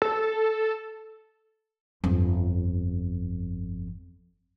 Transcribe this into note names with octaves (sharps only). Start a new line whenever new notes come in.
A4
G1 F2